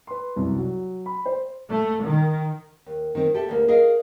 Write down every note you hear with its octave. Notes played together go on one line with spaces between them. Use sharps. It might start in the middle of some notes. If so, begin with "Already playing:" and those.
B4 C6
C2 F#2 C3
F#3
B5
C5
A3
D#3
D#2
D#3 C4
G4 A4 E5
D2 A#3
G#4 A#4 D#5 F5